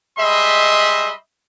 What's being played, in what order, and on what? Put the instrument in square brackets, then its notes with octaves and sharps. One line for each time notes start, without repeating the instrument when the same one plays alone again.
[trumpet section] G3 G#3 D#5 E5 B5 C6